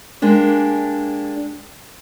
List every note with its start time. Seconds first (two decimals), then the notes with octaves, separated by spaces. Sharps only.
0.22 G#3 A#3 D4 G4